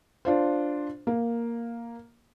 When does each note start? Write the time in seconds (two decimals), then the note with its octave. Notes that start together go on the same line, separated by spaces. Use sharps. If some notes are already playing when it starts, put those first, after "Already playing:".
0.25 D4 F4 C5
1.07 A#3